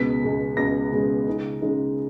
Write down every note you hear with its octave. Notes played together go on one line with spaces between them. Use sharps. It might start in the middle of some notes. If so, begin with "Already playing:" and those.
Already playing: C#2 B2 G#3 B3 B6
C#2 B2 G#3 B3
C#2 B2 G#3 B3 A#6
C#2 B2 G#3 B3
C#3 G#3 D#4
C#3 G#3 D#4